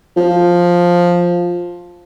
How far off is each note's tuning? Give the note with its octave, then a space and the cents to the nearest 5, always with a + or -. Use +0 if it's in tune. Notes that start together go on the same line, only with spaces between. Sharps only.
F3 +5